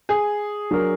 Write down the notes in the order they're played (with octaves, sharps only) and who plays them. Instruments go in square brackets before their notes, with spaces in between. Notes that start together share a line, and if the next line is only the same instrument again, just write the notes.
[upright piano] G#4
[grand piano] F#3 D4 F#4 A#4